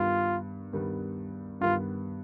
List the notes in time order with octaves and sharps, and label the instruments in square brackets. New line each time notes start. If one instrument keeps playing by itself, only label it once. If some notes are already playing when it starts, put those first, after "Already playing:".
Already playing: [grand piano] G2 D#3 G3 B3 [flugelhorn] F4
[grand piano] G2 D#3 G3 B3
[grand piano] G2 D#3 G3 B3 [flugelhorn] F4